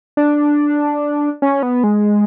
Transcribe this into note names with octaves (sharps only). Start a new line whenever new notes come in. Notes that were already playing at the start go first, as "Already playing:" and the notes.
D4
C#4
B3
G#3